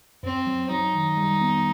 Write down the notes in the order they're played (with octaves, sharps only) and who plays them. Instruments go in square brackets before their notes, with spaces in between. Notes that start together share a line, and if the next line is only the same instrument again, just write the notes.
[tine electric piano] F#2 [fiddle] C4
[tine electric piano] F#3
[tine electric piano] F#3 [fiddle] D#4
[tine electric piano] D#3
G3
B3